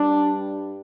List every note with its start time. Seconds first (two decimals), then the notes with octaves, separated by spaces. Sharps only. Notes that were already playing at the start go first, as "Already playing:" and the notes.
Already playing: G2 G3 D4